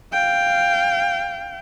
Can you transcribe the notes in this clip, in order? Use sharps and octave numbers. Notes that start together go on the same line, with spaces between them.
F5 G5